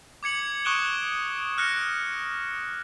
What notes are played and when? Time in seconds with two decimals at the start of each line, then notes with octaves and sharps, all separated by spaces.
0.23 D6 G#6 C#7 F#7
0.65 C#6 D#6 F#6 D7 E7 G7
1.58 F6 F#6 A#6 C#7